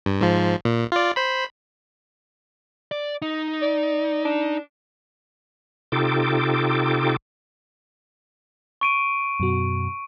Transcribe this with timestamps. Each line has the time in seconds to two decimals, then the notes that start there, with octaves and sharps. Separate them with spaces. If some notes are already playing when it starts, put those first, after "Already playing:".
0.06 G2
0.21 G#2 F3
0.65 A#2
0.92 F4 D5
1.16 C5 B5
2.91 D5
3.22 D#4
3.62 D5
4.25 D4
5.92 C3 D#4 F4 A4 G5 D6
8.81 C#6 D7 D#7
9.40 F#2 B2 F#4